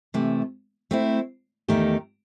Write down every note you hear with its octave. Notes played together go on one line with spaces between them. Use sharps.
C3 E3 A3
A3 C4 E4
E2 D#3 A3 D#4 G4